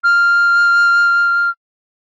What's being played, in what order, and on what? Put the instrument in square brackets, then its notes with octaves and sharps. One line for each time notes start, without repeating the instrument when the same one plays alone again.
[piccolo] F6